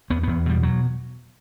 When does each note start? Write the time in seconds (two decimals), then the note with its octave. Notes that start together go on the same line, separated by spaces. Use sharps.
0.10 E2 B3
0.23 E2 B3
0.46 B2 G3
0.63 F#3